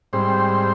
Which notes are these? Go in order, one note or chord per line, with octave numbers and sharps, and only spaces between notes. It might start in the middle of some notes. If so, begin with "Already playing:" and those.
G#2 G3 C4 C5